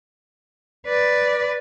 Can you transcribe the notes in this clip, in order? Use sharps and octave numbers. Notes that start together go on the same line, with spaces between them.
B4 D5